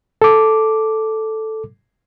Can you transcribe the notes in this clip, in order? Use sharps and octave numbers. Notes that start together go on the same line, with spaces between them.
A4 D6